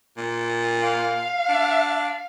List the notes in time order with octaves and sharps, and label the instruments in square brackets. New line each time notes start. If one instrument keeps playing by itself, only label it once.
[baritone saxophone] A#2
[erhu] F5
[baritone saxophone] D4